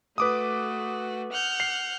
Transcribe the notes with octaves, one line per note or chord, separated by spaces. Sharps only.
A3 F#4 B4 D6 D#6
F#5 F6 G6
C7